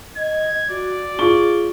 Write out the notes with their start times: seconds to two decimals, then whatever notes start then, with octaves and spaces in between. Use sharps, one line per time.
0.17 D#5 G#6
0.70 F#4 D5
1.19 F4 G#4 C#6 G7